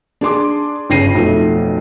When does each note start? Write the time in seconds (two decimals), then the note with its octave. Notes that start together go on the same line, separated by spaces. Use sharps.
0.21 D4 G#4 C6 D6
0.90 G1 C#3 G5 A#6 C7 D#7
1.15 B1 F2 A3